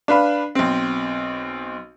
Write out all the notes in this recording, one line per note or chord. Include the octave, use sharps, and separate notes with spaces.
D4 B4 F5 B5
B1 C4